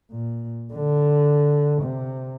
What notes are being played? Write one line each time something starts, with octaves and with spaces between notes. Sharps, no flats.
A#2
D3
C3